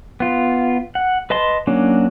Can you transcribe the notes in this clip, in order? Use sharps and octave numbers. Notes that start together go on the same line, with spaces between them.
B3 F4
F#5
B4 D#5 A5 C6
F#3 A#3 C#4 D4